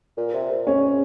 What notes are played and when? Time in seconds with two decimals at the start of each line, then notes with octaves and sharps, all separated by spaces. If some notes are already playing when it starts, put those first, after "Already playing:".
0.17 A#2
0.33 C3
0.51 A#2
0.67 G#2 C#4